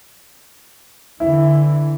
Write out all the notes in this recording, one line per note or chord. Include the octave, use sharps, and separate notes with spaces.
D3 E3 E4